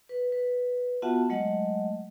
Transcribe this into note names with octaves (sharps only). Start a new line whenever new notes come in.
B4
B4
B3 F4 F#4 E5 F#5 A5
F#3 G#3 A3 D#5 F#5